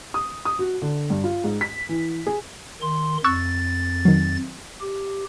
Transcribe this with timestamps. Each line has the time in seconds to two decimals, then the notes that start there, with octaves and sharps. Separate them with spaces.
0.14 D#6
0.45 D#6
0.59 F#4
0.82 D3
1.10 G2
1.24 F4
1.44 G#2
1.61 B6
1.89 E3
2.27 G#4
2.82 D#3 C6
3.24 F2 C#6 E6 F#6 A6
4.05 D#3 F#3
4.81 G4